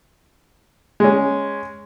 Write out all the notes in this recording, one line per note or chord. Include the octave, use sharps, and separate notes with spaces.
G#3 C#4